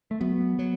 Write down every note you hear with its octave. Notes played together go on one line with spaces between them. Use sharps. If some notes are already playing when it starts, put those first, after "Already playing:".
A3
F#3 B3
F#3